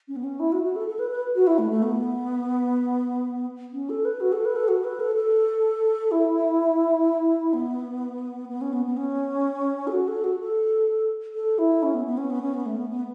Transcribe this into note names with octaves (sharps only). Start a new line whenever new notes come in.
C#4
B3
C#4
E4
F#4
F#4
A4
A4
B4
B4
F#4
E4
A3
A3
B3
C#4
A4
B4
F#4
A4
B4
A4
F#4
B4
A4
A4
E4
B3
B3
C#4
B3
B3
C#4
A4
F#4
A4
F#4
A4
A4
E4
C#4
B3
B3
C#4
B3
C#4
B3
A3
B3
B3